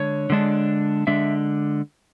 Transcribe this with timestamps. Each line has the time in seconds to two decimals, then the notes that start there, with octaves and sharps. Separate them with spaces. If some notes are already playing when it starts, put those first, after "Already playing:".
Already playing: D3 G#3 D4 C#5
0.30 D3 G#3 D4
1.07 D3 G#3 D4 E5